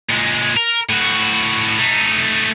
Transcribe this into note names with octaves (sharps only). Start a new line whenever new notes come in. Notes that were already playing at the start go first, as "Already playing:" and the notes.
A#2 G#3
A#4
A2 F#4
A3 D#4